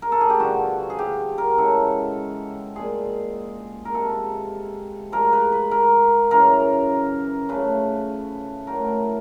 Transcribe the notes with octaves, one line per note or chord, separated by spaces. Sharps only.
A#4
A4
G#4
G4
G2 D3 F3 F#4
G#4
G4
A#4
C#3 E3 G#3 A4
A#2 F3 G#3 G#4
A#4
C3 F3 G#3 A4
G#2 F3 G#3 A#4
B4
B4
A#4
F#2 C#3 E3 A#4
C#3 F3 A3 B4
A2 F#3 A3 A#4